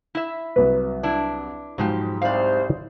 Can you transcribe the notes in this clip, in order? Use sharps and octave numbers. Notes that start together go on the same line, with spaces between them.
E4 E5
C2 F#3 B4
D4 E4
G#2 B2 F3 F#3 G#3 G4
C2 C3 C5 D5 F5